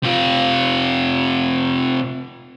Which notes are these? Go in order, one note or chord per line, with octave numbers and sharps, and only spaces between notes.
C3 F4